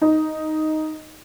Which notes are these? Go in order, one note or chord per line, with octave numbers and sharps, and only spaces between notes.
D#4